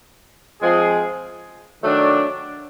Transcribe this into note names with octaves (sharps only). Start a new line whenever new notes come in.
F3 G#3 C4 F4 G#4
D#3 F#3 A3 D4